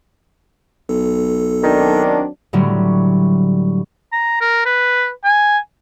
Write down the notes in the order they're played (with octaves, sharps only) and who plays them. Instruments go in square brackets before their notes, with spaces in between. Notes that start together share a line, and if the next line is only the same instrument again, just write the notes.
[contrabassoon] B1 [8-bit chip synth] A4
[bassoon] D#3 [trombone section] F#3 C4 D4
[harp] A2 D3 F#3 G3
[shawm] A#5
A#4
B4
G#5